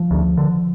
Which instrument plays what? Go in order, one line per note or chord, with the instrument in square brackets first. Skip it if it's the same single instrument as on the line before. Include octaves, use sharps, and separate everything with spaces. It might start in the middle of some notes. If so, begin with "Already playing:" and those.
Already playing: [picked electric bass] F3
D2
D3